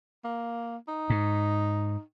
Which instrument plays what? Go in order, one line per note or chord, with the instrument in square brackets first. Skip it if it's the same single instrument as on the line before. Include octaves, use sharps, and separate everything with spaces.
[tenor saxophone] A#3
D#4
[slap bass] G#2